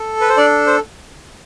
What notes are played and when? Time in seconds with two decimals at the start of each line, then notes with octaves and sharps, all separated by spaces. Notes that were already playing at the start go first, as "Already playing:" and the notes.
Already playing: A4
0.21 B4
0.29 C5
0.37 D4 D5
0.67 C5